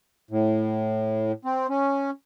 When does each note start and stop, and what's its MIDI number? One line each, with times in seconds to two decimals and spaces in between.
0.31 1.32 45
1.45 1.67 60
1.70 2.10 61